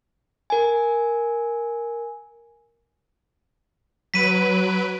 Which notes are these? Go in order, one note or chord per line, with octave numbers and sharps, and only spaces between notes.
A#4 G#5
F#3 B4 B6 D7 D#7